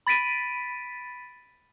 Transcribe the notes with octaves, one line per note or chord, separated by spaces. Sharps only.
B5 A6 B6 D7 D#7